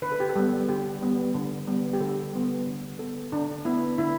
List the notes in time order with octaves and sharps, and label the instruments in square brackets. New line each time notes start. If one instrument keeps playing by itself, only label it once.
[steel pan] D3 B4
A4
G4
A4
G3 B3
D3 G4
G3 B3
D3
G3 B3
G4
D3 A4
G3 B3
D3
B3 A4
D3 D4
B3 E4
D3 E4